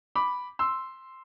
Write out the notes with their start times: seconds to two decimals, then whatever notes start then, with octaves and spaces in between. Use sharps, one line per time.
0.16 B5 D6
0.59 C6 E6